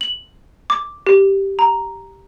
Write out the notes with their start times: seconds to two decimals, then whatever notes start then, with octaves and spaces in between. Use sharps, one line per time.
0.01 F#7
0.70 D6
1.07 G4
1.59 A#5